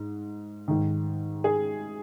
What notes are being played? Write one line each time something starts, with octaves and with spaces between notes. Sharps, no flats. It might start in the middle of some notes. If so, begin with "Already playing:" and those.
Already playing: G#2
G#2 D#3
G#4